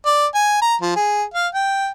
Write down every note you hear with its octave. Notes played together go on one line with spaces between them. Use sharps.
D5
G#5
A#5
F3
G#4
F5
G5